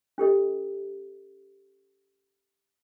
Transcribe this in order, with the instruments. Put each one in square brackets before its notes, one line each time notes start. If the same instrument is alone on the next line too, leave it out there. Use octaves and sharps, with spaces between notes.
[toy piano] C#4 G4 A4 D#5